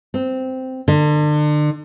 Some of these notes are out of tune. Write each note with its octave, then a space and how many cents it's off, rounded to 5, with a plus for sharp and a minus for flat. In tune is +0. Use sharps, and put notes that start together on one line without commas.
C4 -10
D3 +35